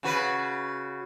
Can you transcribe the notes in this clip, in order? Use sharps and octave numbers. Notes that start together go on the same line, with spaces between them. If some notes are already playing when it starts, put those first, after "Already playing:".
C#3 F#4 B4